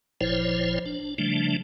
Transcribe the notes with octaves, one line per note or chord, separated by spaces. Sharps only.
G1 A#2 F3 E4 C5 C#5
D4
C#3 F3 G3 A3 D4